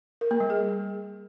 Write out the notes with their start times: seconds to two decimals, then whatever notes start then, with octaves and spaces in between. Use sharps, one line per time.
0.21 A#4
0.31 A#3
0.40 G3
0.50 G#4